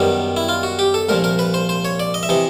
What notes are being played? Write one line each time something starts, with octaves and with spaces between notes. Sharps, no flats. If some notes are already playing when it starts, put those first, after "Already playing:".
Already playing: F#2 D#3 G3 B3
E4
F4
F#4
G4
A4
C2 A#2 F3 A#4
A#4
B4
C5
C5
C#5
D5
D#5
E5
C3 E3 D#5